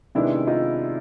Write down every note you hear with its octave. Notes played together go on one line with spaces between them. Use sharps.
C3 D#3 G#3 B3 D4 E4
D#4 F4